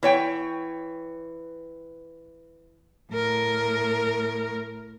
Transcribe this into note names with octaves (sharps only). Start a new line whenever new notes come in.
E3 C#5 G5
A2 A#4